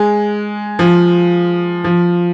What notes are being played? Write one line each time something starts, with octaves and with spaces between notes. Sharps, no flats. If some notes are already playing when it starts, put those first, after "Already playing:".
Already playing: G#3
F3
F3